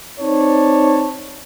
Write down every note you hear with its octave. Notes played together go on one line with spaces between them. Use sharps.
C4 D#4 C#5 D5 A5